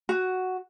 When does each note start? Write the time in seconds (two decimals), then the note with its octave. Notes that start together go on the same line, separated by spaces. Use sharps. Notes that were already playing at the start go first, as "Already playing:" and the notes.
0.09 F#4